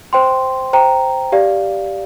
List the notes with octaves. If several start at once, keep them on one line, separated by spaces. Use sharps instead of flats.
C5 G5 C6
C5 G5 A#5
G4 D5 F5